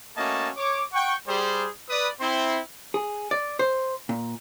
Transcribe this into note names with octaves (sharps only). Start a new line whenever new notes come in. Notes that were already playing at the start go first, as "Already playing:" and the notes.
A3 A#3 C#4 F#4 D#5 A5
C#5 D6
F#5 G5 C#6
G3 G#4 C5
B4 D5 D#6
C4 E4 C6
G#4
D5
C5
A#2